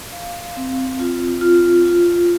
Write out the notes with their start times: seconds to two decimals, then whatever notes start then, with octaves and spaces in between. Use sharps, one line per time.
0.13 F5
0.56 C4
0.99 F4
1.41 F4
1.86 F4